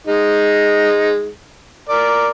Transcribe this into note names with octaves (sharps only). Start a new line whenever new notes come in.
G#3 D#4
A#4 D5